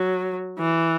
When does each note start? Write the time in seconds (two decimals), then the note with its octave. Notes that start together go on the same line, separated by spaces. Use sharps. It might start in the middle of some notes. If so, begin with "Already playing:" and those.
Already playing: F#3
0.59 E3